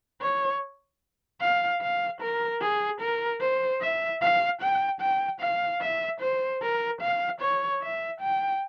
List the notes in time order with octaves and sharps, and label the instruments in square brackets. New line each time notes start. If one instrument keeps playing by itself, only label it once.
[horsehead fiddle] C#5
F5
F5
A#4
G#4
A#4
C5
E5
F5
G5
G5
F5
E5
C5
A#4
F5
C#5
E5
G5